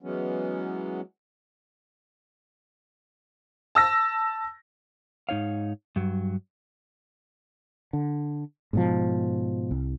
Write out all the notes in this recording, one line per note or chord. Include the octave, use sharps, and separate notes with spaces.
E3 F#3 G#3 B3 C#4
A5 E6 A#6
G#2 D#4 C#5 F5
G2 F#3
D3
G#2 B2 F3
C2